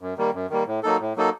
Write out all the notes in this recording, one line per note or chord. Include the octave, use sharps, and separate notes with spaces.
F#2
D#3 G3 A#3
F#2
D#3 G3 A#3
A2
F#3 A#3 D#4 A4
A2
F#3 A#3 D#4 A4